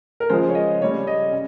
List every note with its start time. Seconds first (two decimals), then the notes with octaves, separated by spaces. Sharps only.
0.20 A#4
0.29 C#3 F3 G#3 C5
0.49 C#5
0.55 D#5
0.81 C#3 G3 C#5
1.07 D#5
1.32 C#3